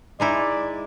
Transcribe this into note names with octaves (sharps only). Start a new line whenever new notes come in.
G#3 D#4 E4 D5